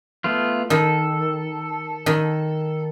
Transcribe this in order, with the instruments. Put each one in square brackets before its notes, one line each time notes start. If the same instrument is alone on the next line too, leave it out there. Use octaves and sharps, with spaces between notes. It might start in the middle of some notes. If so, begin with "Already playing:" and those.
[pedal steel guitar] A3 B3 F4
[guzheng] D#3 [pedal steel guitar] A4
[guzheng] D#3